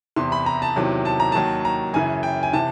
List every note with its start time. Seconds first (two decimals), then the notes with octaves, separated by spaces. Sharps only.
0.16 E2 C3 E3 C6
0.32 B5
0.46 A#5
0.62 A5
0.76 E2 C3 D#3 F#3
1.05 A5
1.20 A#5
1.32 D#2 D#3 F#3 A5
1.65 A#5
1.93 F#2 C#3 E3 G#5
2.23 G5
2.43 G#5
2.53 C3 E3 A5